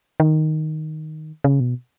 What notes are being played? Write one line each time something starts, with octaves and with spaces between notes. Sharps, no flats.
D#3
C#3
B2